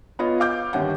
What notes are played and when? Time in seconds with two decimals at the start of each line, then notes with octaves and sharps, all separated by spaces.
0.19 B3 F4 C#5 D#5
0.40 F5 D6 G6
0.73 G1 D#2 C#4 F#5